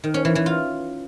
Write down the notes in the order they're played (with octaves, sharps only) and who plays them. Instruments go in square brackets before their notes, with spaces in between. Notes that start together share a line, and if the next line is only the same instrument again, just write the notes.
[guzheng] D#3
C#4
E3
E3
F4